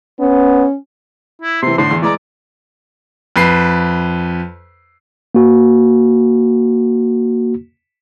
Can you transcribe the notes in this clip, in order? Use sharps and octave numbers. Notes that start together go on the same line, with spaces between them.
B3 C#4
E4
C3 E3 C6
A2 D3 C6
E2
E3 G#3 D5 A#5
F2 B4 C7
A#3 F#4